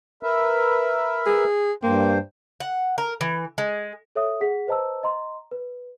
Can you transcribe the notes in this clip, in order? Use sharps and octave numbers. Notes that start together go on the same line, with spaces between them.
A#4 B4 E5
G#4
G2 A#3 C5 G5
F#5
A#4
E3
G#3
A4 C#5 E5 D#6
G#4 F#5 B6
B4 C5 D#5 A5 A#5 E6
D#5 A#5 C6
B4